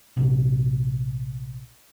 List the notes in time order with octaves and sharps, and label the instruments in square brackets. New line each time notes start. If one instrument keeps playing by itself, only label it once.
[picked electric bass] A#1 C3